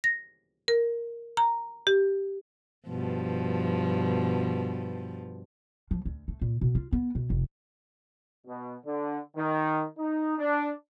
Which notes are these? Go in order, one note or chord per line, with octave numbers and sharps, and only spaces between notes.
A#6
A#4
A#5
G4
G2 B2 F3
F3
D2
A3
A#2
B2
F4
B3
B2
F1
B2
D3
D#3
D#4
D4